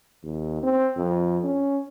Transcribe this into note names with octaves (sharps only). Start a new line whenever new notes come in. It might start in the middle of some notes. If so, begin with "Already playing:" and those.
D#2
C4
F2
C#4